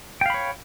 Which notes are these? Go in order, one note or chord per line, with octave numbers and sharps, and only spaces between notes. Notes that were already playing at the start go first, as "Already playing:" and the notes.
C#5 F5 G5 B5